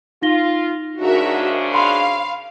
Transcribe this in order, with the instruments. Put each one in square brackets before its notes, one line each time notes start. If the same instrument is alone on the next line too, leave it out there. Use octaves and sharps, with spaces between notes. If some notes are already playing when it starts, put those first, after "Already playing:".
[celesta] D#4 A#6 G7 [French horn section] F4
[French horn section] G#2 C#3 D4 [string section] F#4 A#4 E5
[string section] F5 [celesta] B5 C6